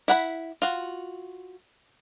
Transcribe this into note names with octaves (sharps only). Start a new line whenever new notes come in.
E4 F#5 B5
F4 F#4